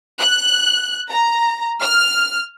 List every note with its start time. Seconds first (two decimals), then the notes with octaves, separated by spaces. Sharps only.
0.20 F#6
1.10 A#5
1.81 F6